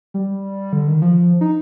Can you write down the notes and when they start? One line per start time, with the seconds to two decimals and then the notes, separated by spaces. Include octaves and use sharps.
0.14 G3
0.73 D3
0.88 D#3
1.02 F3
1.41 D#4